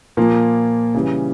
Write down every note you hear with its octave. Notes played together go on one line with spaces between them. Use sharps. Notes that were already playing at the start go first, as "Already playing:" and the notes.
A#2 F3 A#3
C#3 E3 G3